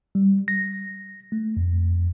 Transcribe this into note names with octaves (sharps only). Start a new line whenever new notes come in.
G3
A#6
A3
F2